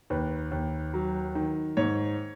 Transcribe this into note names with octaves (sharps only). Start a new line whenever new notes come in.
D#2 B4
D#2
F#3
D#3
G#2 C#5